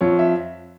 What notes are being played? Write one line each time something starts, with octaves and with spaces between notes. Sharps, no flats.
F2 C#5
E5